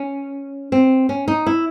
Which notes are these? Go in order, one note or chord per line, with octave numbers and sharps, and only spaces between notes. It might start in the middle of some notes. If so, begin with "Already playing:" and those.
Already playing: C#4
C4
C#4
D#4
E4